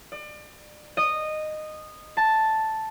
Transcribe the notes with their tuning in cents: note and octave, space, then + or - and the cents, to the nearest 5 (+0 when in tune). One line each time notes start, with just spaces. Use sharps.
D5 +35
D#5 -15
A5 +0